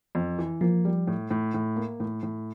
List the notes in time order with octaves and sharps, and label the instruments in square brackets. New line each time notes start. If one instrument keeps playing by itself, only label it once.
[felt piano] F2
E3
[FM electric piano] F3 [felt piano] A#3
[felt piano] G3
A2
A2
A2
A#3
A2
A2